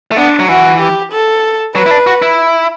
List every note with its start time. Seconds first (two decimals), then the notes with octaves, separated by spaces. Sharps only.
0.12 A3
0.17 B3 D4
0.40 F#3
0.49 E3 F#4
0.80 G4
1.12 A4
1.75 F#3 B4
1.86 E4
1.91 D4
2.07 F#4
2.22 E4